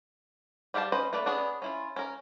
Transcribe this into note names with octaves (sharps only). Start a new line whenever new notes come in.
G3 G4 F5 G5 A5
C#4 B4 C5 D#5
A3 A#3 B4 D5
B3 C#4 D4 G#4 C#5
C#4 E4 F4
C#4 A#4